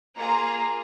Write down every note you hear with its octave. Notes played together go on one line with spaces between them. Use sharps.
A#3 F4 G#4 A#5